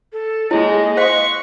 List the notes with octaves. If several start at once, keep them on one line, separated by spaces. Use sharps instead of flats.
A4
G#3 A#3 E4 G#4 C#5 D#5
C5 F5 C6 C#6 F#6